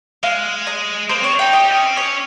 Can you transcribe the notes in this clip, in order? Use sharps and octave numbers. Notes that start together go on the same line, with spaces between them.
G#3 F5
D#5
A#3 C5
C4 C#5
D#4 G5
G4 D#5
G4
C#4
C4
C#4 C#5